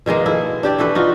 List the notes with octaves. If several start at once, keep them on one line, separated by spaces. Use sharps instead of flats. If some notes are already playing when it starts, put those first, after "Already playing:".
B2 D#3 G#3 A#3
E4 A4
D4 G4 D5
E3 F#4 A4 B4
D#4 F4 F#4